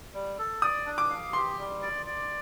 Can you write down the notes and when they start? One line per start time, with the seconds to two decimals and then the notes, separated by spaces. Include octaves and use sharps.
0.14 G3
0.39 A4
0.62 D5 D#6
0.86 D4
0.98 D6
1.10 F5
1.33 G4 C6
1.58 G3
1.82 D5
2.06 D5